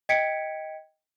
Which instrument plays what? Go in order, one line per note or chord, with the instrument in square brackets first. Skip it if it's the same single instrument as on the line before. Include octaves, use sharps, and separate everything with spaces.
[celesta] D#5 G5 G#6 B6 C#7 D7